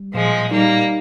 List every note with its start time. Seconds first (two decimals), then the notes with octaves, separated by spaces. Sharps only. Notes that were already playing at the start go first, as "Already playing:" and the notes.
Already playing: G3
0.14 A#2 F3 G#3
0.51 G3 A#3 D#4